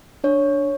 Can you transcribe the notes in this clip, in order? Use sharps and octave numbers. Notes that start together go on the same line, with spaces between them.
D4 C#5